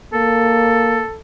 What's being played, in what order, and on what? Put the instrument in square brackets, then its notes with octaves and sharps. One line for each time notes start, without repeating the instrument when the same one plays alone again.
[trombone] A#3 [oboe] A4